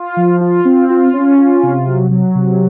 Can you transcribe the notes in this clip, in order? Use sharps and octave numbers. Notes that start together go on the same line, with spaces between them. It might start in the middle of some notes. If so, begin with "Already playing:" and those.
Already playing: F4
F3
F4
C4
F4
C#4
F4
C3
F#3
F#3
C3